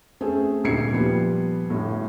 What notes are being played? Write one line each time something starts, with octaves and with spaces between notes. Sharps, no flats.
A3 C4 C#4 G#4
D#1 G#1 D2 G#6 C7 C#7
A#2 F3 G3 B3
G1 A2